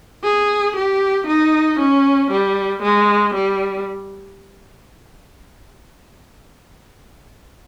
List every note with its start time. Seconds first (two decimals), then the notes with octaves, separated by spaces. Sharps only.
0.23 G#4
0.76 G4
1.27 D#4
1.79 C#4
2.31 G3
2.82 G#3
3.34 G3